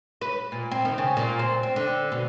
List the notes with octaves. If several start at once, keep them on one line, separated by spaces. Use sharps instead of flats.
B4
A#2
C4
D#3
C#3
A#2
C4
C4
D3
B2